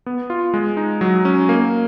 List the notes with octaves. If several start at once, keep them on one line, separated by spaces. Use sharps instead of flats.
B3
F4
G#3
D#4
F#3
C#4
A#3